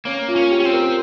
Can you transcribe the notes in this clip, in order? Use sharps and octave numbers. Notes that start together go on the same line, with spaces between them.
A#3 C#4
F4
C#4
G4
C#4
C4
A#4